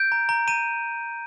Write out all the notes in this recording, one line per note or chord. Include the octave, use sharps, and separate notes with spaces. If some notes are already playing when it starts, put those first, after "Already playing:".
Already playing: G6 D7
A#5
A#5
A#5 D#7